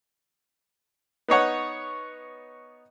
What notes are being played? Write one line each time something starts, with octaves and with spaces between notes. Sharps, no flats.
B3 D#4 C#5 F#5